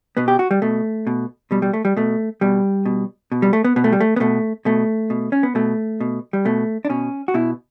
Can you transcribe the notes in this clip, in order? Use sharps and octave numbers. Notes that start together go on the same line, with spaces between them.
B2 B3
G4
F#4
G3
B2 A3
B2
B2 G3
G3
A3
G3
B2 A3
B2 G3
B2
B2
G3
A3
B3
B2 B3
A3
G3
A3
B3
B2 A3
B2 A3
B2
C#4
B3
B2 A3
B2
G3
B2 A3
D4
B2 C#4
F#4
B2 E4